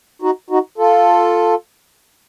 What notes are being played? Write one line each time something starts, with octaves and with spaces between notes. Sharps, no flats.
D#4 F#4
D#4 F#4
F4 A4